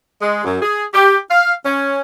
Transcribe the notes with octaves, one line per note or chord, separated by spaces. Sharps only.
G#3
F#2
G#4
G4
F5
C#4